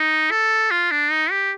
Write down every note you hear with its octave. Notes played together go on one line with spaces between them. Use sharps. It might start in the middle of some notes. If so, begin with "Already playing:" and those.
Already playing: D#4
A4
F4
D4
D#4
G4